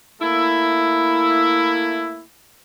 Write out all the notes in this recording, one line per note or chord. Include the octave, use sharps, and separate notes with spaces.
A3 A#3 E4